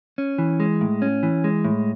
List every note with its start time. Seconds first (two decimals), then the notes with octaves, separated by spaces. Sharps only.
0.18 C#4
0.38 E3
0.60 G#3
0.81 A2
1.02 C#4
1.23 E3
1.44 G#3
1.64 A2